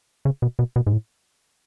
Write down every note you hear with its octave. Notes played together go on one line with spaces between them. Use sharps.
C#3
B2
B2
B2
G#2
A2